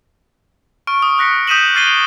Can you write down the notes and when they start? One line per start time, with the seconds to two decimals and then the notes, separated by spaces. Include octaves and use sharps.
0.87 C#6 F6 D7
1.02 D#6
1.18 D#6 F#6 A#6 B6 C#7
1.47 D#6 G6 B6 D#7 E7 F#7
1.75 D6 F6 A6 C7 D#7 G7
1.87 D7 F7